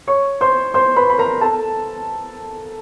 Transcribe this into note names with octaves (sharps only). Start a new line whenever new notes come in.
C#5 C#6
C5 C6
C5 C6
B4 B5
B5
A#4 A#5
A4 A5